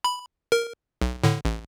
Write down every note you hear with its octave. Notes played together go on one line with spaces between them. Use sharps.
B5
A#4
B1
A2 D3
A1